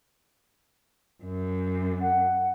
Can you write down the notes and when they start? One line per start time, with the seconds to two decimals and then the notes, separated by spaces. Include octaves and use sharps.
1.23 F#2
2.01 F#5